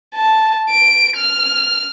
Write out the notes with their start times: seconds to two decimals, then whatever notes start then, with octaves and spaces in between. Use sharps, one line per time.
0.15 A5
0.70 D7
1.16 F6